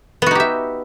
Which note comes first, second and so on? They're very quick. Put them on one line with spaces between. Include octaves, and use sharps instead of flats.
B3 F#4 D#4 G4 E5